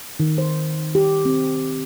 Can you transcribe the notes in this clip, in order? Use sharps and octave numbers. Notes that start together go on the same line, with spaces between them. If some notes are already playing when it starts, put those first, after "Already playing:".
D#3
C5
G4
C4